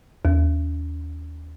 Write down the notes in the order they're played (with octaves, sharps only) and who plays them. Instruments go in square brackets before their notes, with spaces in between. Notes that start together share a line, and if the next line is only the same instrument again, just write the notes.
[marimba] D#2